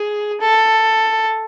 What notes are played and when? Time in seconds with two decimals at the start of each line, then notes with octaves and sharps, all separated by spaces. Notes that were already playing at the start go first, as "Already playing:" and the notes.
Already playing: G#4
0.41 A4